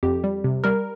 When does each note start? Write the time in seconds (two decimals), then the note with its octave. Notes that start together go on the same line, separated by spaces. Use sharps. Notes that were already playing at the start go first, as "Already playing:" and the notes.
0.03 F2 G4
0.24 G3
0.44 C3
0.64 G3 A#4